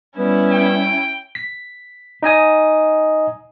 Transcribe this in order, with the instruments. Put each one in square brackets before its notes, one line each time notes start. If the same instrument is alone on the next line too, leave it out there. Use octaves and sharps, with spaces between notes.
[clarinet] G3 [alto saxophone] B3 [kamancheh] C#4 E4
[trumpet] G5
[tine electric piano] B6
D#4 D#5 G#5 D#6